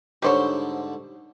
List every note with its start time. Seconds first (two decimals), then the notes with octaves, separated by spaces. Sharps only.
0.22 G#2 D3 G3 D4 C5 C#5